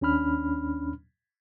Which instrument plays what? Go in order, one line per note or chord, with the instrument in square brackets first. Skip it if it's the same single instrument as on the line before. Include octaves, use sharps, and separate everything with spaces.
[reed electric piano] D#2 C#4 D4 B5 F6